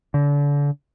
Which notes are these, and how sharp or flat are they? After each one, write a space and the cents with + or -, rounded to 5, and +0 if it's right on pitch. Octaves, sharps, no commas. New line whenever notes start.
D3 -35